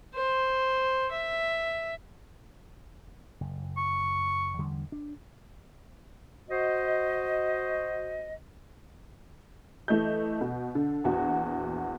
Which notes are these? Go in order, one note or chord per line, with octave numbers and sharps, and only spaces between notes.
C5
E5
F#1
C#6
E2 D3 G3
D4
F#4 C5 D#5
E3 A3 D#5 G6
B2
D3
A#1 E2 F#4